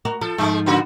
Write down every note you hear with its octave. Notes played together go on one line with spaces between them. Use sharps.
F#4 A#4
F3 A4
G#2 F3 G#3 A3
C#3 A#3 F#4